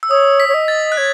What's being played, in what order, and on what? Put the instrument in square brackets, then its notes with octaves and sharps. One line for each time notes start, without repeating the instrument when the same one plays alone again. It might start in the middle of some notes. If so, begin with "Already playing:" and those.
[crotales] E6
[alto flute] C#5 [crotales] D#6
[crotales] B6
[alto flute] C#5
D#5
[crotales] A6
F#6
[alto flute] C#5 [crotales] G#6